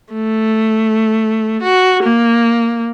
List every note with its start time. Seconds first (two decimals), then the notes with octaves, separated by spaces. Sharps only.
0.13 A3
1.62 F#4
2.03 A#3